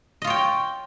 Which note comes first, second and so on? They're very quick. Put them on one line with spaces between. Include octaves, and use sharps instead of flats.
D#5 F4 C#5 G5